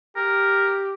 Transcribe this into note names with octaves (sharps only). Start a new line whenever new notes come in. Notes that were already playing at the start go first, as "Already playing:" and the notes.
G4 A#4